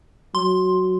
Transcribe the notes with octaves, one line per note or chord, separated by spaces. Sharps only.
F#3 C6